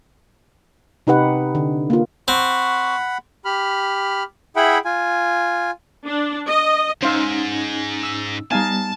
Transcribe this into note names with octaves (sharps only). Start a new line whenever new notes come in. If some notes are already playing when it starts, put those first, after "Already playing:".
C3 D#4 G4 B4 F#5
D3
A#3 F4
C4 F#5 B5 C#6
G4 B5 F6
E4 G#4 E5 F#5 G5 B5
F4 G#5
D4
D#5
G#2 C#4 D#4 C5 F5 E6
E6
G3 B3 D#4 F5 G#5 A5